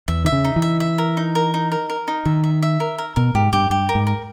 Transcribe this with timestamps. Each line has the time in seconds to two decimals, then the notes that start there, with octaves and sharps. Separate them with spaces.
0.08 E2 E5
0.25 D#3 E5
0.32 C#3
0.45 D#4
0.56 E3
0.62 E5
0.80 E5
0.98 A#4
1.17 D#4
1.35 A#4
1.54 D#4
1.72 A#4
1.90 A#4
2.08 D#4
2.25 D#3 E5
2.44 E5
2.62 E5
2.80 A#4
2.98 A#4
3.16 B2 A#4
3.35 G#2 G4
3.53 G2 G4
3.70 G2 G4
3.89 A#4
3.95 G#2
4.07 A#4